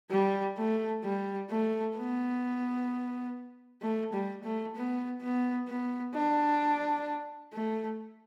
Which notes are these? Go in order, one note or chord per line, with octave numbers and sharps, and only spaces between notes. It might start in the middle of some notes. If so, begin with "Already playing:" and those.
G3
A3
G3
A3
B3
A3
G3
A3
B3
B3
B3
D4
A3